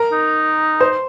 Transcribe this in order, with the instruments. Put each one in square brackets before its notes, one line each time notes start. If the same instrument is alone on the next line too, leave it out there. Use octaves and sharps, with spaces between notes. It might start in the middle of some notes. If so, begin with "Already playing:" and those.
Already playing: [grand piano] A#4 A#5
[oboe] D#4
[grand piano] C5 C6